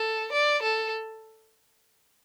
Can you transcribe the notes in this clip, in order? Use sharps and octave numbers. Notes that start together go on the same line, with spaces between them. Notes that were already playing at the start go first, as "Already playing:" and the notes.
Already playing: A4
D5
A4